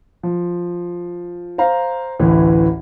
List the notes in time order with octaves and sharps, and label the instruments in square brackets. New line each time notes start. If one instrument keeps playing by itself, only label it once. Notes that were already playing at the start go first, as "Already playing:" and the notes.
[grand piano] F3
C5 F5 A#5
A1 D2 A2 E3